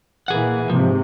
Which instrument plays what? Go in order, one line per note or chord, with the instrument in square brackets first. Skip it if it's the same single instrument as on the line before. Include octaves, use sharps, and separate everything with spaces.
[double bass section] A#2 E3 A#3 [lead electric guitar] G#4 F#5
[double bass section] G#2 C3 [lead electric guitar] F3